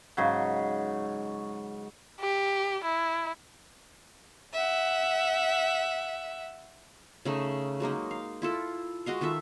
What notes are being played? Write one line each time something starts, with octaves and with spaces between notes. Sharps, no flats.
G#2 C#3 F#3
G4
E4
E5 F#5
C#3 A3 D#4
F#3 G#3 A#3 D#4
F5
E4 F4 A4
G#3 F#4 D#5 F5
D#3 F4 A4 E5